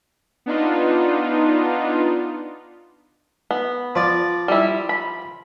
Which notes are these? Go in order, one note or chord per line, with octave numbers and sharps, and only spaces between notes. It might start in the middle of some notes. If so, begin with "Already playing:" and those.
B3 D4 D#4 F4
B3
F3 D5
G3 E4
B5